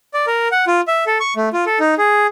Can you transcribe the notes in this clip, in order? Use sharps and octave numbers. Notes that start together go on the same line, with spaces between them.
D5
A#4
F#5
F4
E5
A4
C#6
A3
F4
A4
D#4
G#4